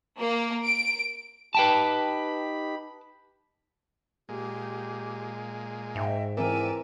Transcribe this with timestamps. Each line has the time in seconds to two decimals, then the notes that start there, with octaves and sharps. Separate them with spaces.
0.19 A#3
0.66 D7
1.55 D#4 G4 B4 G5 A5 B5
4.29 A#2 G#3 G4
5.95 G#2 D#5 E5 G5
6.37 E3 C4 A#4 D5 E5 G5 G#5 A#5